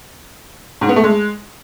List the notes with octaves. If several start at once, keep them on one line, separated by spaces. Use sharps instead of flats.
G#2
B3
A3
G#3